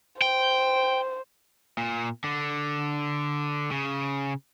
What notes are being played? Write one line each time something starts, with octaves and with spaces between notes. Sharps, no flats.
C5 G5
A#2
D3
C#3